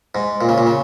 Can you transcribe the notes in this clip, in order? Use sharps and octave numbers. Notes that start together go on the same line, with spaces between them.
G#2
A#2
C#3
A#2
C#3